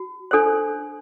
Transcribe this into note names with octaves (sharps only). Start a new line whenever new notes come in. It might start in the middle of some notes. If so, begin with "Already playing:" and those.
Already playing: F#4
D4 A4 C5